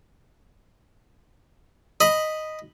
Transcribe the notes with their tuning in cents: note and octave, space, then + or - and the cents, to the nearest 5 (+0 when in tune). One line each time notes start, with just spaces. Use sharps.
D#5 +0 B5 +0